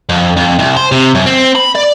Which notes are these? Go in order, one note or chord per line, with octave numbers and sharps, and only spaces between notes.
F2
F2
C2
C5
C3
F#2
C4
B5
D5